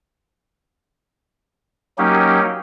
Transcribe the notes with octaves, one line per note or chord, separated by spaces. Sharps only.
F#3 A#3 C#4 D#4 G4